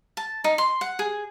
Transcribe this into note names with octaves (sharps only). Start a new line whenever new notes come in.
A5
D#4
C6
F#5
G#4